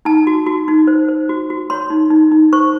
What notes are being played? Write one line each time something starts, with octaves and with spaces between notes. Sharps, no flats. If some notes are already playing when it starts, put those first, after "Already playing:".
D#4 A5
F#4
F#4
D#4
C5
C5
F#4
F#4
C#5 C6
D#4
D#4
D#4
C5 C#6